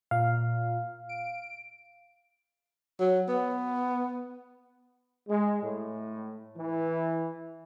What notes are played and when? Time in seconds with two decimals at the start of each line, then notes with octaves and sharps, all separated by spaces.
0.11 A#2 F5
1.09 D7
3.00 F#3
3.29 B3
5.28 G#3
5.63 A2
6.57 E3